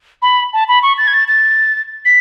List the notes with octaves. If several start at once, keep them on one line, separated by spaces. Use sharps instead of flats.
B5
A5
B5
C#6
A6
G#6
A6
A6
B6